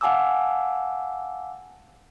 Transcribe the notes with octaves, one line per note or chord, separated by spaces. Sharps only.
F5 F#5 G#5 A5 D6 E6